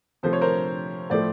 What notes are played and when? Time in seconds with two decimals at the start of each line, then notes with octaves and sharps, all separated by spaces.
0.23 C3 F3 A3 C5
0.33 C#5
0.41 A#4 C5
1.10 A2 F3 A3 C5 D5